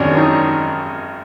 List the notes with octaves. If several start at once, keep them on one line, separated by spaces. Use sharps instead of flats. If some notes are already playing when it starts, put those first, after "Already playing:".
Already playing: G#1 F#2 D#3 C#4 D4
D#4